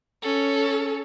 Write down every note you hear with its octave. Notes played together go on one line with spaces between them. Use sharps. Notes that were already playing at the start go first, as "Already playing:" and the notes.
C#4 A4